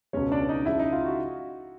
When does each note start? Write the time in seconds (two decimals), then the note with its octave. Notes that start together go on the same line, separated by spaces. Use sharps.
0.13 C#2 B2 G#3 C#4 C#5
0.32 D4 D5
0.49 D#4 D#5
0.65 C#2 C#3 F3 G#3 E4 E5
0.79 D#4 D#5
0.92 F4 F5
1.05 F#4